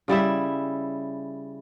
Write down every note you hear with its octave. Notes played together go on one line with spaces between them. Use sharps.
C#3 G3 E4 E5